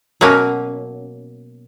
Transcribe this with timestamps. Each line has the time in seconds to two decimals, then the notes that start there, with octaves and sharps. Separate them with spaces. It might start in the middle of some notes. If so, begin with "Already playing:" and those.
0.21 B2 F#3 A#3 C#4